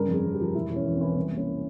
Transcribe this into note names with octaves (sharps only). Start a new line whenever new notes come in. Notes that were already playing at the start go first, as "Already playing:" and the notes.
Already playing: G2 C#3 A#4
F2
G#4
F2
G4
F3
E1 E4
E1
C#4
E3
E3 C4
C2 C4
A#3
C#4